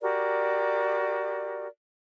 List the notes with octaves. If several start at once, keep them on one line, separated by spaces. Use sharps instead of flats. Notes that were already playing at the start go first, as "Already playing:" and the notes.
F#4 G4 A#4 D5